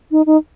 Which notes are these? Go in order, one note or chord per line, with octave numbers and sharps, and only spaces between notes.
D#4
D#4